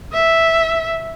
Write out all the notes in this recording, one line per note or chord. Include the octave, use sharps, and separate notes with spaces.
E5